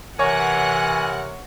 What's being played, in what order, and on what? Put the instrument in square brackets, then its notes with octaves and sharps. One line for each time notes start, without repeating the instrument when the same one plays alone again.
[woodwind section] C3 E3 A#4 [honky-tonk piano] C#5 [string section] F#5 F#6 [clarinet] G#5